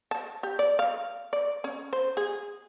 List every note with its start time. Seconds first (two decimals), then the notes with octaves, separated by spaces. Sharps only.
0.11 A5
0.43 G4
0.59 D5
0.79 F5
1.33 D5
1.64 C#4
1.93 C5
2.17 G#4